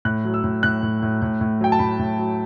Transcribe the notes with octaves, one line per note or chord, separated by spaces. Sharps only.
A2 F#6
F#3
E6
A2
A2 F#6
A2
A2
A2
A2
F#3 G5
A5
A2 B5
A2
F#3